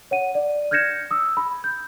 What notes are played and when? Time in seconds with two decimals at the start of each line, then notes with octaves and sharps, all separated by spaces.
0.11 C#5 F#5 D#7
0.35 D5
0.71 F6 G6 G#6 A#6 C#7 E7
1.11 D#6 E6
1.37 B5
1.64 G6